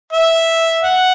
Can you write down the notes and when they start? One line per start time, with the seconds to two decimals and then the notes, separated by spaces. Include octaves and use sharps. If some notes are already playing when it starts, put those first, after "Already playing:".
0.13 E5
0.83 F#5